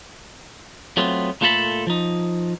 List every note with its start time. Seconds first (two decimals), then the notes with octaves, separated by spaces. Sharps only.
0.97 F#3 A3 B3 C4 F4
1.41 A#2 A3 F4 A4 A5 B5
1.87 F3 D#4